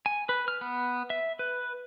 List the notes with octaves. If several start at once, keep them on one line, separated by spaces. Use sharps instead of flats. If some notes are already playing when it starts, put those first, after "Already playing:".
G#5
B4
F6
B3
E5
B4